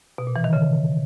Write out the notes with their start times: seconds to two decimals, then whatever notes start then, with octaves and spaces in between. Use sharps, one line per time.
0.18 B2
0.27 A#2
0.36 E3
0.44 D#3
0.53 C#3